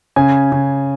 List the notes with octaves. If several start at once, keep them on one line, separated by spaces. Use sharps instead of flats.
C#3 G#5
C#3